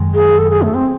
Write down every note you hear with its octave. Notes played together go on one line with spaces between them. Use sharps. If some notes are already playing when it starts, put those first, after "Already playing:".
Already playing: F#2 D#3 G#3
G#4
A4
G#4
A3
C4